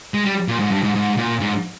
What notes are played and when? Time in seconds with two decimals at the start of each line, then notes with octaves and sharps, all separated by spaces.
0.14 G#3
0.25 G3
0.48 A#2
0.60 G#2
0.71 G2
0.83 G#2
0.95 G#2
1.17 A#2
1.40 G#2